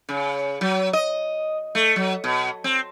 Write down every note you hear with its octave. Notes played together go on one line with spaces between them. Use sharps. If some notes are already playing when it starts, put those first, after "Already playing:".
C#3
F#3
D#5
A3
F#3
B2
C4